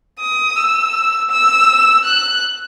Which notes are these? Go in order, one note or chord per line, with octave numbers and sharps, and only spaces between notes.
D#6
E6
E6
F#6